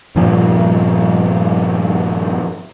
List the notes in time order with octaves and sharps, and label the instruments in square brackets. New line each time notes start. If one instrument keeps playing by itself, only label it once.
[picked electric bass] G2 A#2 F3